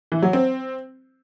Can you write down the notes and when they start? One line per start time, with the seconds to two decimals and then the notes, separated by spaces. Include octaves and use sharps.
0.12 E3
0.22 F#3
0.33 C4